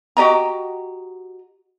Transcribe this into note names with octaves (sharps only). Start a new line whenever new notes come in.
F#4 G4 D#5 A#5